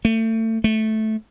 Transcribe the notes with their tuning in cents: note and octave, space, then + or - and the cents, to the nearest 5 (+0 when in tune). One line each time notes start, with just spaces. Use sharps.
A3 +30
A3 -10